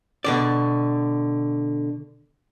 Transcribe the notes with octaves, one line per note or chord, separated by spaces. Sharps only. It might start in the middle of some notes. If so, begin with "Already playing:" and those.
B2 D3 D5